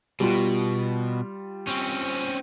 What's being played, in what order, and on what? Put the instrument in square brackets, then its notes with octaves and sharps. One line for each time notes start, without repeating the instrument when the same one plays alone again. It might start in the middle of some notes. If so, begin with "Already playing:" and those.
[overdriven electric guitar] B2 [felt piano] G3 F4
[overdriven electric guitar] C4 C#4